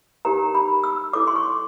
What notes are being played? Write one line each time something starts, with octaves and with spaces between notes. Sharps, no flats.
D#4 G4 A#4 C#5 A#5
B5
E6
E4 A4 C#5 D6
C6
C#6